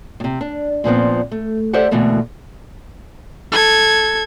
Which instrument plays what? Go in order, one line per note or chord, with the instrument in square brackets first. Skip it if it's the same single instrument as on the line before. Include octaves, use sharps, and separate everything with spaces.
[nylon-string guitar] A2 C3
D4
A#2 F3 B3 C4
A3
G4 A4 C5 D5 E5 F#5
D2 B2 E3 A3 A#3
[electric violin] A4 G#6